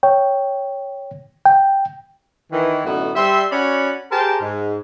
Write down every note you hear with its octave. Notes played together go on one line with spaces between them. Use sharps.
C#5 G5
G5
D#3 E3
F#2 A2 D3 B3 D#4 F#4
G3 E5 C6
C#4 F#4 C#5 D5 F#5 B5
G4 G#4 A#4 C5 G5 A5
G#2